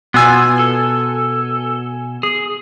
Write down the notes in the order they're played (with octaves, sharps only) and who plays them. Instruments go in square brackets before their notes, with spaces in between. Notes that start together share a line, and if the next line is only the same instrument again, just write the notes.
[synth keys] B2 G#5 [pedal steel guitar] B3 F4 E6
[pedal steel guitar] A4
G#4